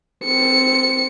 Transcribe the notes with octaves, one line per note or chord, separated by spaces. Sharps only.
C4 C#7